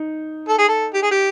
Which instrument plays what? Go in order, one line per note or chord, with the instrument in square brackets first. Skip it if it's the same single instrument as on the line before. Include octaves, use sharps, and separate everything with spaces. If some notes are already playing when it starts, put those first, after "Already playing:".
Already playing: [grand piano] D#4
[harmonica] A4
G#4
A4
G4
G#4
G4